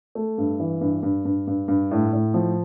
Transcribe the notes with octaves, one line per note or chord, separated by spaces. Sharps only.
A3
G2
E3
G2
G2
G2
G2
G2
A2
A2
F3